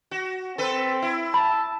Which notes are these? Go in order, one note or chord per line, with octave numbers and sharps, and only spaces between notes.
F#4
C4 A4 B4
E4
A5 B5